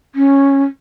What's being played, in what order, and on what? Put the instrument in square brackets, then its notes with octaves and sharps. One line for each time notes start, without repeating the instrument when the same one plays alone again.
[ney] C#4